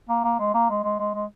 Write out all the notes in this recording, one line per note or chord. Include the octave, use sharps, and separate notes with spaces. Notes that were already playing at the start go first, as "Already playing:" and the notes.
A#3
A#3
G#3
A#3
G#3
G#3
G#3
G#3